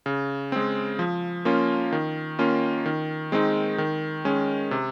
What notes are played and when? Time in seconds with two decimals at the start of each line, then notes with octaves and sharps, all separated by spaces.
0.06 C#3
0.52 G#3 C4
0.99 F3
1.45 A#3 C#4 F4
1.92 D#3
2.39 A#3 C#4 F4
2.86 D#3
3.32 G#3 C4 D#4
3.78 D#3
4.25 G#3 C#4
4.71 C3